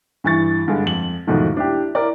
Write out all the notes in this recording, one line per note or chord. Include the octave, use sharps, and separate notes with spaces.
G2 E3 C#6 A6
G2 D3 G#3
F2 F#7
E2 G#2 B2 D#3 F3 A3
D4 E4 G4
E4 A#4 D5